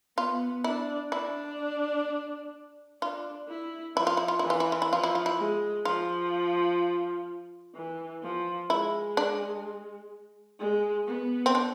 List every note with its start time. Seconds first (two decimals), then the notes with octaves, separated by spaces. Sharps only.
0.17 B3 F4
0.64 D4 E4
1.12 D4 E4
3.02 D4 F4
3.49 E4
3.96 F3 E4
4.07 F4
4.17 E4
4.28 F4
4.39 E3 E4
4.50 F4
4.60 E4
4.72 F4
4.82 E4
4.91 F3 F4
5.03 E4
5.15 F4
5.26 E4
5.39 G#3
5.85 F3 F4
7.75 E3
8.23 F3
8.70 G#3 E4
9.17 D4
10.59 G#3
11.07 B3
11.46 C4
11.55 D4